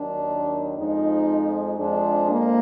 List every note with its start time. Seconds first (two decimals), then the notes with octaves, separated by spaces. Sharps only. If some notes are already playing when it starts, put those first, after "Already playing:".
Already playing: D#2 D#3 F#3 D4
0.76 F2 F3 G#3 D#4
1.77 F2 F3 G#3 D4
2.28 A#3